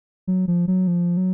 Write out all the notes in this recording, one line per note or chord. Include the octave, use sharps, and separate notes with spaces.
F#3
F3
F#3
F3
F#3